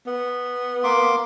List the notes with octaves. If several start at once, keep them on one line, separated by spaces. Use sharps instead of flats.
B3
A#3 C6 D6